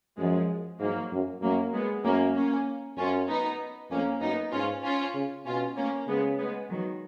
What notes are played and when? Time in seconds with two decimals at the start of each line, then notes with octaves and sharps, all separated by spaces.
0.18 F#2 F3 G#3
0.80 G#2 F#3 A#3
1.12 F#2
1.42 F#2 F#3 A#3
1.74 G#3 B3
2.04 F#2 A#3 C#4
2.36 A#3 C#4
2.97 F#2 C#4 F4
3.28 B3 D#4
3.90 F2 A#3 C#4
4.21 F#2 B3 D#4
4.52 G#2 C#4 F4
4.84 C#4 F4
5.14 C#3
5.46 B2 C#4 F4
5.77 A#3 C#4
6.08 C#3 G#3 B3
6.39 G#3 B3
6.70 D#3 F#3